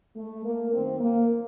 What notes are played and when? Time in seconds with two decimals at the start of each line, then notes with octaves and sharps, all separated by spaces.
0.16 A3
0.44 A#3
0.72 F#2 D#3 A3 C4
1.00 A#3